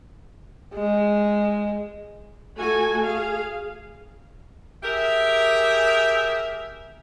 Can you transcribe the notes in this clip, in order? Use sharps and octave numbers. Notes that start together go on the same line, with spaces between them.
G#3
A3 F#4 A4 G#5
G#4 F5
G4 G#4 A#4 E5